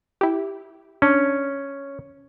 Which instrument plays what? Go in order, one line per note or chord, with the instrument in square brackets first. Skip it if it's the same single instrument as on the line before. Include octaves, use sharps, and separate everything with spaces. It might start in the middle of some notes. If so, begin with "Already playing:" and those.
[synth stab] E4 G4
[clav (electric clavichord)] C#4 [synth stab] D4